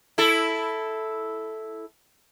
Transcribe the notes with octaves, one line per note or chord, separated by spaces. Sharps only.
E4 A4